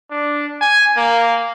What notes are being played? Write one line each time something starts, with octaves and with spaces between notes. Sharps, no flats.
D4
G#5
A#3